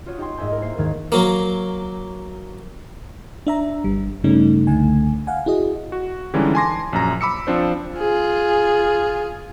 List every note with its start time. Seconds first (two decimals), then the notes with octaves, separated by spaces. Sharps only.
0.06 F4 F#4 C#5 D#6
0.18 D#4 G4 G5 G#5 C6
0.37 G#2 D#5 E5 G#5 G6
0.49 E4 A#4
0.62 A#3 C5 C7
0.78 D#2 G#2 D#3 A#4 A#5 G#6
1.12 F#3 A#3
3.47 D4 E5 A#5
3.84 G1 G3
4.24 G2 C#3 G3 A3 C#4 D#4
4.67 C#2 D3 A3 G#5
5.27 F5 F#5 G#5
5.46 E4 F#4 G#4 D#5
5.92 F#4
6.34 D3 E3 G3 G#3 C#4 D#4
6.55 G#5 A5 C6 D6 A#6
6.93 A#1 F#2 A#5
7.21 B5 D6 E6 C#7
7.47 F3 C4 D4 C5
7.97 F4 G#4